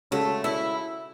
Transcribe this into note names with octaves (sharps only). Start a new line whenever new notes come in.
C#3 G#3 A3 C#4 F#4 A4
E4